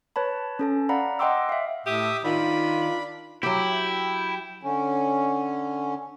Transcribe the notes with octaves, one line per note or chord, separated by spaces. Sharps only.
B4 C#5 A5 B5
C#4 A4 A5
D5 F5 F#5 A#5 B5
D#5 F#5 G5 C6 D6 E6
E5 F5
A2 G4 E5 D#6
D#3 D4 F4 B5
F#3 E4 G4 G5
D3 C#4